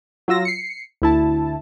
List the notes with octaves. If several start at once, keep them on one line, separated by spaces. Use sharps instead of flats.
F#3 F4 E6 A#6
C7 C#7
D2 E4 A5